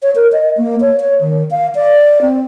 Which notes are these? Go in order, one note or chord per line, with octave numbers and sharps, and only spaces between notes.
C#5
A#4
D#5
A#3
C#5
C#5
D#3
F5
D5
C4